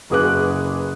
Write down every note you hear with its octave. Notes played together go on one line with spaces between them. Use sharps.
F#1 F#4 G#4 B4 D6 F#6